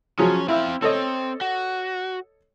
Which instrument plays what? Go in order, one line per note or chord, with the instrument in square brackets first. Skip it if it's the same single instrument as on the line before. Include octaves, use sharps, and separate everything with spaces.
[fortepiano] F3 F#3 G#4 [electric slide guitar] C#4
[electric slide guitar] C4 F5 [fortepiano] E4 E5
[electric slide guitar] C4 [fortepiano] A4 C#5 D#5
[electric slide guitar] F#4